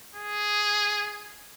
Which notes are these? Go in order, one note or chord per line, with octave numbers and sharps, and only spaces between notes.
G#4